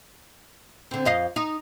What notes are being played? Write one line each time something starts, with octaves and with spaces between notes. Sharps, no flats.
D3 C4
F2 D#5 F5
D#4